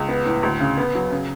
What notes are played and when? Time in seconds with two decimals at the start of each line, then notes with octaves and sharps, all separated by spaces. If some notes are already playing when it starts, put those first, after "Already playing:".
Already playing: C#2
0.09 B3
0.26 A2
0.43 D2
0.60 C#3
0.78 B3
0.95 F#3
1.12 C#3